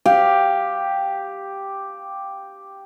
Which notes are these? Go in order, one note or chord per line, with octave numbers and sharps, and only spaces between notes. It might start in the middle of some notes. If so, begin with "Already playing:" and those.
G4 F5